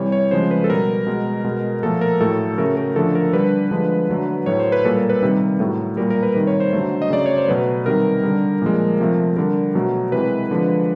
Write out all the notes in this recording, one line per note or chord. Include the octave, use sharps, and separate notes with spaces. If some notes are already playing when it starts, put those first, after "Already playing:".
Already playing: C3 E3 G3 C#5
C#5
C#3 F3 G#3 C5
B4
A4
B2 G3 A#4
B2 G#3
B2 G#3
A#2 F3 A3 A4
A#4
A2 F#3 A3 A4
C#3 F#3 A3 A#4
A#4
D3 F3 A3 A4
A#4
D3 G3 B4
D3 F3 G#3
D3 F#3 A3
A2 F#3 A3 C#5
C5
B4
A#2 G3 A4
A#4
B4
C3 D#3 G3
A2 F#3 A3
A#2 G3 A#4
A#4
B4
C3 D#3 G3
C#5
C5
D3 F#3 A3
D#5
C#3 F#3 A3 D5
C#5
C5
B2 F#3 A3 B4
C3 D#3 G3 A#4
D3 G3
A#2 F3 G#3
C3 F3 A3
D3 G3 A#4
B2 F#3 A3
C3 E3 G#3 B4
D3 F3 G#3